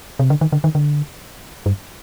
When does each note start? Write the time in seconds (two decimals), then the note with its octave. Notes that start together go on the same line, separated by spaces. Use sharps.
0.19 C3
0.30 D3
0.41 D#3
0.52 D3
0.64 D#3
0.75 D3
1.66 G2